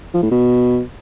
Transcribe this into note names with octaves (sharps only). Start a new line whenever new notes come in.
F3
A2
B2